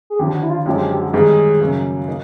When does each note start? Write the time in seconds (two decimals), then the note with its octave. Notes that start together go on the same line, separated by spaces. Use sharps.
0.10 G#4
0.19 D#2 D3 F3 G4
0.35 F#4
0.43 E4
0.50 F4
0.66 F#2 D3 F3 G#3 G4
0.78 G4
0.90 G4
1.02 F#4
1.14 G#2 D#3 G3 B3 D#4 G#4
1.60 F#2 C#3 F#3 A#3 C#4
2.08 A#3 D#4